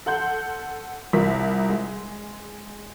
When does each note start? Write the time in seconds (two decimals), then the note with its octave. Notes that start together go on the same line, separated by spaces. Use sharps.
0.06 A4 F#5 C6 G6
1.13 C2 F4 A#4 B6
1.69 G#3